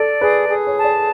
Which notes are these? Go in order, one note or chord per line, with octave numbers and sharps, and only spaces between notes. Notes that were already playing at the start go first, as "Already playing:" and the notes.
Already playing: A4 D5
G#4 B4
G#4
C#5
A5
D5